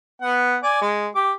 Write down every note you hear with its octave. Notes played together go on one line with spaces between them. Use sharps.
B3 F#5
D5 G#5
G#3
G4 D6